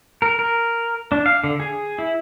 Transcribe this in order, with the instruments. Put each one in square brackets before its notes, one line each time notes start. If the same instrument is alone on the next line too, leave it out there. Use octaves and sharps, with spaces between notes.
[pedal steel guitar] A#4
A#4
D4
F5
D3
G#4
E4